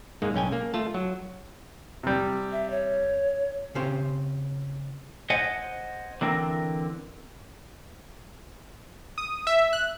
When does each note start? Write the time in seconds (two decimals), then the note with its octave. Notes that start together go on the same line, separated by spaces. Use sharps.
0.22 G#2 G#3 A#3 D#4
0.34 B1 C#4 G5 G#5
0.52 A#3
0.74 A3 F4 A5
0.94 F#3
2.03 C3 G3
2.52 E5
2.70 C#5
3.75 C#3 C4 C#4 G4 C5
5.30 C5 D#5 F#5 G#5
6.21 D3 E3 C4 A#4
9.18 D#6
9.47 E5
9.73 F#6